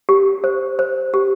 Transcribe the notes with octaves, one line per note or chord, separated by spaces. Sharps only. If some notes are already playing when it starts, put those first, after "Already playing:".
G4
C5
C5
G4